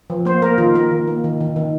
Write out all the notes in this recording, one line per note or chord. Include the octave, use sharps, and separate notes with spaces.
F3
A#3 C5
A#3 A#4
D#3 F4
A#3 A#4
D#3
A#3
D#3
D#3
D#3